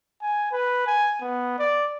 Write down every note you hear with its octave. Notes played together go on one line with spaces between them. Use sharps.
G#5
B4
G#5
B3
D5